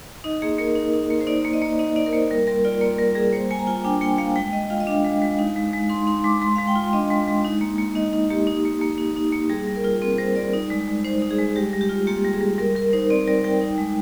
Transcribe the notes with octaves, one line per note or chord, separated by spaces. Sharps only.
D#4 D#5
A#3 G#4
A#3 A#4
D#4
D#4
A#3
C5
D#4 D5
A#3
D#5
A#3
D#4 D#5
D#4 D5
A#4
A#3 C5
G3 A#4
G3 A#4
F4 D5
A#3 D5
G3 A#4
G3 G#4
A#3 C5
A#3 G#5
A#5
F4 G#5
D4 G5
A#3 G5
A#3 F5
G#3 G5
G#3 D#5
F4 F5
D#5
D4 F5
G#3
G#3
D#4
G#3
G#3
D#4 C6
D#4 C6
G#3 D6
G#3 C6
G#3 F5
G5
F4
D4 D#5
G#3
G#3
D#4
A#3
A#3
D#4 D#5
D#4
A#3 G4
D#4
A#3
A#3
D#4
D#4
A#3
G3 G#4
G3
A#4
F4
C4
G3 C5
G3 D5
D#4
G#3
G#3
D#4 C5
D#4
G#4
G#3
G3 G4
G3
G4
F4
A#3 G4
G3
G#4
G3
G3 A#4
G3 A#4
D#4 C5
C4 D5
G3 D5
G3 G5
D#4
G#3